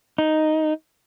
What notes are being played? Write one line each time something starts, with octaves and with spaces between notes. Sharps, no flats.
D#4